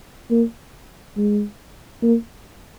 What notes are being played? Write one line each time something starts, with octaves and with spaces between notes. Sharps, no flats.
A#3
G#3
A#3